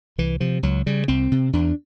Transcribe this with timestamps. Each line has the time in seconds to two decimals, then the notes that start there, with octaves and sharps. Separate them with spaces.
0.18 C2 E3
0.40 C3 F3
0.63 C#2 F#3
0.86 C#3 G3
1.08 C2 C4
1.32 C3
1.53 E2 D4